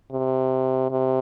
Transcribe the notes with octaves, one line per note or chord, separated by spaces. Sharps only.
C3
C3